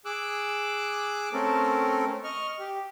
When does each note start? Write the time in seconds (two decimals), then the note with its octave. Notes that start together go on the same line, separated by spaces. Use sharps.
0.06 G#4 D6 E6 F#6
1.33 A3 C4 C#4 A4 A#4
2.24 D#5 C#6 F6
2.59 G4